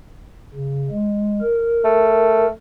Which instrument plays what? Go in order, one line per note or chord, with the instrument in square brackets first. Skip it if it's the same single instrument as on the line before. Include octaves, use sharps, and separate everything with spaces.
[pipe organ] C#3
G#3
A#4
[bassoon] A3